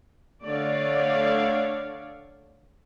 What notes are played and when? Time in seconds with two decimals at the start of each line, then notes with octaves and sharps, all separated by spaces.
0.44 D3 A3 C#5 D5 F5